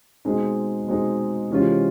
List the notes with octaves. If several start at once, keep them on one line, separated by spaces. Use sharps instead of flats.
B2 G#3 C4 D#4 G#4
B2 G#3 C4 D#4 G#4
C3 E3 G#3 C#4 F4